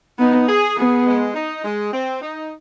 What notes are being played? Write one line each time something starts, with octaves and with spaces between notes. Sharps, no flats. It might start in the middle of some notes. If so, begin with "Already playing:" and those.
B3 D#4
G#4
B3 G#4
G#3
D#4
G#3
C4
D#4